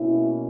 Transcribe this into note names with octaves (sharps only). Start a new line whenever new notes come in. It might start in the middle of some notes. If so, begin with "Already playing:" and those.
Already playing: B2 A#3 C#4 E4